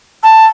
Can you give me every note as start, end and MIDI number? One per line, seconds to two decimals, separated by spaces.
0.24 0.45 81